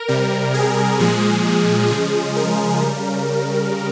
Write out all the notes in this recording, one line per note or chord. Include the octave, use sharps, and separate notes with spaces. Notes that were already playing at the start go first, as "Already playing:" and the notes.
Already playing: A#4
C3 G3
G#4
A#2 F3 G#3
C#3 F3 G#3 G#4
A#4
C#3 G3